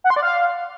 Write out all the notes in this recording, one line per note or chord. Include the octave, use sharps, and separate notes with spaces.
F#5
C6
D5
F5